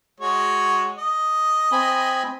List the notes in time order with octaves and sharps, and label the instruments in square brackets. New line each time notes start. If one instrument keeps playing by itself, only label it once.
[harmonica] G#3 F#4 C#5
D#5
[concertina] C4 G#5 B5